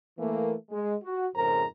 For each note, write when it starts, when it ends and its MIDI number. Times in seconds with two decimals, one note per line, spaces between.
0.18 0.54 52
0.18 0.54 57
0.18 0.54 58
0.70 0.94 56
1.03 1.27 66
1.35 1.63 41
1.35 1.63 44
1.35 1.63 49
1.35 1.63 70
1.35 1.63 72
1.35 1.63 82